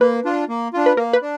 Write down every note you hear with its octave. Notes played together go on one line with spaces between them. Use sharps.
A#3 B4
D4 F4
A#3
D4 F4
B4
A#3 A#4
B4
D4